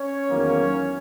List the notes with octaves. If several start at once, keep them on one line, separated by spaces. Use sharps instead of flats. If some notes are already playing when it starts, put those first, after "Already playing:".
Already playing: C#4 C#5
E2 D#3 F#3 A#3